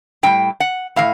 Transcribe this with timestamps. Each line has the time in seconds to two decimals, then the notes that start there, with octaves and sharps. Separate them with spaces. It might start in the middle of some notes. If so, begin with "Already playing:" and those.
0.23 A2 E3 G3 G5
0.60 F#5
0.96 A2 E3 F5